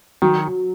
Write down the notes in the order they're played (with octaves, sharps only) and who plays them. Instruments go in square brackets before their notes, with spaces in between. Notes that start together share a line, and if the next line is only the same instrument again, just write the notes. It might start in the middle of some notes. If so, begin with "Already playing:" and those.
[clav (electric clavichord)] D#3 [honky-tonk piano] F#3